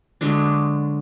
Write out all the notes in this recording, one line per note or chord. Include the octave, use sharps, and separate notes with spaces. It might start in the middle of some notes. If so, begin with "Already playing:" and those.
D3 F#3 G#3 D4